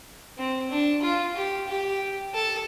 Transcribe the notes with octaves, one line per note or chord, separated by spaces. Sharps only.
C4
D4
F4
G4
G4
A4